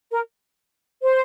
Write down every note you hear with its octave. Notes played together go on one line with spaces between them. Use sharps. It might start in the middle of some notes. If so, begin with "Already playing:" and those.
A#4
C5